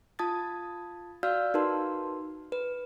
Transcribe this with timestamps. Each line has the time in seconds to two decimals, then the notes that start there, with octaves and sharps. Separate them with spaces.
0.19 F4 A5 D#6 G#6 A6
1.23 F#4 D5 F5 E6 F6 G6
1.54 D#4 F#4 A#4 B4 A5 C6
2.52 B4